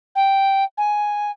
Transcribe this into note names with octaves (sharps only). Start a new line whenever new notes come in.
G5
G#5